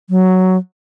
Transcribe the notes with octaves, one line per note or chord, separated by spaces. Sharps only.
F#3